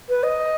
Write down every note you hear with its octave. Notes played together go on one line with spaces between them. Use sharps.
B4
D#5